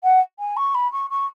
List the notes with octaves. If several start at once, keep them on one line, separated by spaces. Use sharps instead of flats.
F#5
G#5
C#6
B5
C#6
C#6